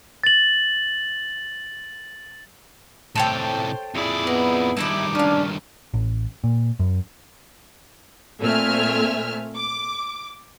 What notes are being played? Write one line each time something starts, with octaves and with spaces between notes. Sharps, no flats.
A6 F#7
A2 C3 A4 C5 C#5 G5
F2 E4 G#4 D5
B3 D#4
G2 D#3 D#4 E4 E5 B5 D6
C#4 D4 F4
A1
A#2
F#2
A#2 A3 C4 E5 G#5 F6
D6